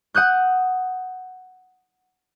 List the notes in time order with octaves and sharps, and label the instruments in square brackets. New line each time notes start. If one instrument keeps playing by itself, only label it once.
[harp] F#5 D#6 F#6 G6